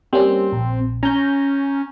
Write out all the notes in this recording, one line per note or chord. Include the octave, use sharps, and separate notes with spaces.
G3 A#3 C4 C#4
A#1
C#4 A#5 G6